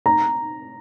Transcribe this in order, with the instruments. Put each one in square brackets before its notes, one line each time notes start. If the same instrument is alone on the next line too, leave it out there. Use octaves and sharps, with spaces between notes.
[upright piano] A#5